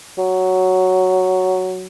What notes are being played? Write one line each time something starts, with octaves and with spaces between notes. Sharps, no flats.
F#3